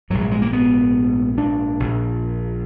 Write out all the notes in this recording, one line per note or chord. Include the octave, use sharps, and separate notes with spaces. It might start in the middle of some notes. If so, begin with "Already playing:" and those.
A#1 G#2 F#3
F#3
G#3
A#3
B3
D4
A#1 A#2